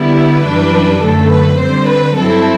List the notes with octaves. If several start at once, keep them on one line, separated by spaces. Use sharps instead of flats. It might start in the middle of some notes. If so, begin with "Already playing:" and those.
Already playing: D3 G3 B3 E4
B4
F#2 E3 G3 D4
F#2 D3 A3 A4
B4
D3 G3 C4 C5
B4
G2 F#3 C4 E4 A4